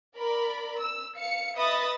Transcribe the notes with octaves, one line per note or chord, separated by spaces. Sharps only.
A#4 D5 B5
E6
F5 C#7
B4 D#5 E5 B5 D#6 A6